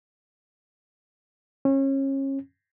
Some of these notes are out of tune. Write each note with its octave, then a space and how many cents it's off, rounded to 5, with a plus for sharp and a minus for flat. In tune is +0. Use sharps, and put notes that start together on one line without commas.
C#4 -30